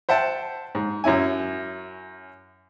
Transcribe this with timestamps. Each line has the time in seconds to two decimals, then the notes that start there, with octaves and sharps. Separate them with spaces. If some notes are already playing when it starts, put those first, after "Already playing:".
0.09 C5 E5 F#5 G5 A5
0.75 G#2
1.04 F#2 C#4 E4 G#5